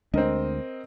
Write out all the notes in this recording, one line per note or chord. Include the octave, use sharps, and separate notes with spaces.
D2 G#3 C4 D4 A#4 D#5